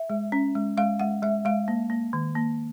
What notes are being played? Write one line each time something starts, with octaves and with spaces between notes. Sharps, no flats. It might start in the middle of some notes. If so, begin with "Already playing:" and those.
Already playing: E5
G#3
C#4
G#3
G#3 F5
G#3 F#5
G#3 E5
G#3 F5
A#3
A#3
D#3
A#3